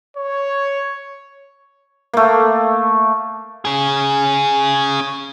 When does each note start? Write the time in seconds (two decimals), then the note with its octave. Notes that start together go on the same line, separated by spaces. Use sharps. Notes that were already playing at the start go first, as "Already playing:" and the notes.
0.17 C#5
2.14 A3 A#3
3.65 C#4 G#4